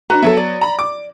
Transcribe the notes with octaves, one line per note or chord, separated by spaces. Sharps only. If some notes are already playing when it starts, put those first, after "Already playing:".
D4 F#4 B4 A#5
F#3 B3 A4 E5
D5
A#5 B5
D6